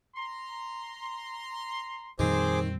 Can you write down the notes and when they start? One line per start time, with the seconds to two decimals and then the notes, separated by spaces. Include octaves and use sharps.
0.16 A#5 C6
2.19 F2 A#2 D#3 G3 C4 G#4 C5 D6